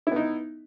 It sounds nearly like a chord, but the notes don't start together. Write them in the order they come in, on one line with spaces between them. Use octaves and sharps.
E4 B3 D#4